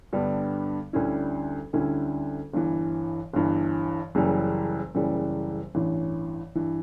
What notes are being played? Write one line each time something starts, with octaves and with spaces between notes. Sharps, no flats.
G2 D3 G3 B3
D2 D3 G3 C#4 E4
D2 D3 G3 C#4 E4
G1 G2 E3
G1 G2 E3
F#1 F#2 C#3 E3 G3
F#1 F#2 C#3 E3 G3
A1 G2 E3
G2 E3